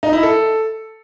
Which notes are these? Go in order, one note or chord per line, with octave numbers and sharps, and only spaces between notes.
D#4
E4
A4